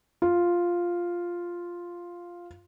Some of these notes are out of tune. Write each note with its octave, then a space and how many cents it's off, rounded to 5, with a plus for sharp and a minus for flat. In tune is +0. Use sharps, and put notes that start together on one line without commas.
F4 +0